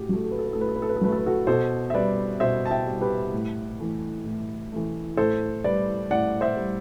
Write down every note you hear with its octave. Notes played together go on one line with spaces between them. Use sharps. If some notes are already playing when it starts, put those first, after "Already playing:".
Already playing: A2 F#4 G4
F#3 A3
A4
B4
A4
B4
A4
A2
B4
A4
B4
A4
B4
A4
F#3 A3 B4
A4
B4
F#4 A4
B2 A4 C5
E5
G3 B4 D5
B2 C5 E5
A5
E5 G5
G3
G4 B4
A2
E3 A3
A2
E3 A3
A2 A4 C5
G3 B4 D5
A2 D5 F#5
C5 E5
G3